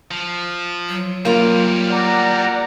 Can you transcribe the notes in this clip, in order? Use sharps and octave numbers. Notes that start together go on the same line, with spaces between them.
F3
F#3
G3 A#3 F4 A#4
D5 F#5 A#5